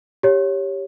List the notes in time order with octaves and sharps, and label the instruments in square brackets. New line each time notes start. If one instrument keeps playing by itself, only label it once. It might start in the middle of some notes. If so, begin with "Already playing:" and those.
[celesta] G4 C#5